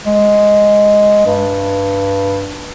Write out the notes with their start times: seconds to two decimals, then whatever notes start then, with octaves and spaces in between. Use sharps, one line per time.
0.05 G#3
1.26 G2